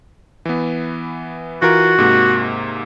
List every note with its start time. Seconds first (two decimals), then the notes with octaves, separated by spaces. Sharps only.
0.45 E3 B3
1.62 E3 F4 F#4 A#4
1.98 G#2 C3 A#3